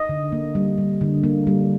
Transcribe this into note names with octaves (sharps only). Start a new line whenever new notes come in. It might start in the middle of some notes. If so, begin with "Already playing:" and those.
Already playing: D#5
D3
A#3
G3
G3
D3
A#3
G3